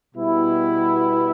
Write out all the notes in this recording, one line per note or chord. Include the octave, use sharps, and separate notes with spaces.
B2 G3 B3 E4